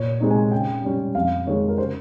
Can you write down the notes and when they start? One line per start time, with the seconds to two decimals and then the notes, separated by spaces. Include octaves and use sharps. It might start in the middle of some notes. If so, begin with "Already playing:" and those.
Already playing: A#2 C#5
0.20 G#3 C4 D#4
0.31 G#5
0.52 C#3 G5
0.84 G3 C#4
1.15 F2 F5
1.47 D#3 G#3 C#5
1.68 A#4
1.78 C#3 C5